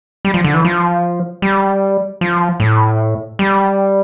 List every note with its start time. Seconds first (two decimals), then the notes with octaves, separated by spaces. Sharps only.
0.25 G3
0.34 F3
0.44 D3
0.54 E3
0.65 F3
1.42 G3
2.21 F3
2.60 A2
3.39 G3